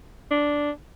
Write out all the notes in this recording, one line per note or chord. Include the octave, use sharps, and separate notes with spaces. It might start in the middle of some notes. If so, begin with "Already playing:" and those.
D4